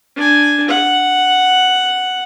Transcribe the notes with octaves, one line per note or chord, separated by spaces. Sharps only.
D4 G#5
F#5